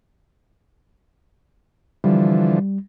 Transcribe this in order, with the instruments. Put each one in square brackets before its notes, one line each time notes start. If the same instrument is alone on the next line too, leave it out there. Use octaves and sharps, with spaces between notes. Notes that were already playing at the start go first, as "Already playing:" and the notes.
[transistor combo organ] D3 E3 F3 [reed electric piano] G3